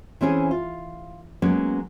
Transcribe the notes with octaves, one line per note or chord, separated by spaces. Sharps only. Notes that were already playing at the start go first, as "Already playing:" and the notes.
E3 C4 C#4 G#4
F4
F#3 G#3 A#3 B3 C#4